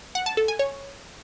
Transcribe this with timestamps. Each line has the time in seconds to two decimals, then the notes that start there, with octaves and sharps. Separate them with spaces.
0.15 F#5
0.26 A5
0.37 A4
0.48 G#5
0.59 C#5